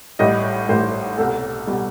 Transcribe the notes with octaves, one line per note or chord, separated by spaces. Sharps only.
A1 A2 G3 D#5
A1 A2 G3 C5
C2 B2 G3 A4
B2 G3